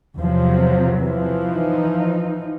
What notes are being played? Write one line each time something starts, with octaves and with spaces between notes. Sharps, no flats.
E2 C3 F3 F#3
E3 F3
D#4